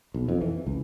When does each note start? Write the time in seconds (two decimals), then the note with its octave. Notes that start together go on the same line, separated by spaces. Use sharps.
0.14 B1
0.29 F2
0.41 E3
0.66 C#2